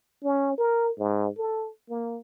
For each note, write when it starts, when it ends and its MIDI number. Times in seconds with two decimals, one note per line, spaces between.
0.24 0.58 61
0.58 0.92 70
0.98 1.29 44
1.38 1.69 69
1.90 2.19 58